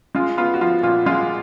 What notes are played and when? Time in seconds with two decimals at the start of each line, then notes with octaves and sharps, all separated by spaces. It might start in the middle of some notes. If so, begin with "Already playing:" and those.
0.15 G#3 F4
0.37 B3 F4
0.54 F#4
0.61 F3 F4
0.83 A#2 F4
1.06 G#3 F4